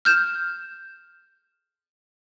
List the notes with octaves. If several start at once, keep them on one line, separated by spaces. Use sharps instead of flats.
F6 G6 E7